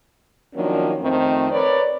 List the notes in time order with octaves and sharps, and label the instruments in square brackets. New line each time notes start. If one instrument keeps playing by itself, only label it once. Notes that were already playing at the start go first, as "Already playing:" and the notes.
[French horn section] D#3 F3 F#3 A#3 C#4 D4
F2 D#3 A3 C4
A#4 B4 C#5 D5